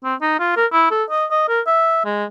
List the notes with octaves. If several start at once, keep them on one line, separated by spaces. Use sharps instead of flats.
C4
D#4
F4
A#4
E4
A4
D#5
D#5
A#4
E5
G#3